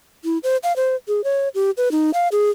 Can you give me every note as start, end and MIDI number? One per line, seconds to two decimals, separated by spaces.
0.24 0.38 64
0.43 0.57 72
0.63 0.75 77
0.76 0.96 72
1.08 1.24 68
1.24 1.48 73
1.55 1.71 67
1.77 1.91 71
1.92 2.11 63
2.14 2.28 77
2.32 2.50 68